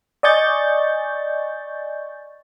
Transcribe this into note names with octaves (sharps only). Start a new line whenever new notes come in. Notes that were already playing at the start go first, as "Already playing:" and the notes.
D5 D#5 G#5 C#6 G6 A6